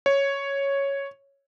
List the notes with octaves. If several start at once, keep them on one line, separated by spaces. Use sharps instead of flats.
C#5